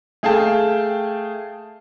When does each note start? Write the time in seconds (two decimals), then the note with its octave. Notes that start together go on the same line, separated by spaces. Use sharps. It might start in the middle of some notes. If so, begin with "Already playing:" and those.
0.23 A3 G#4 F5 G5 A5